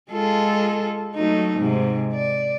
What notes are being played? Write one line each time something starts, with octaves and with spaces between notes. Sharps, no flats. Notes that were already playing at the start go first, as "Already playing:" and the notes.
G#3 F4 A4
F#3 A3 D#4
G#2 C3
D5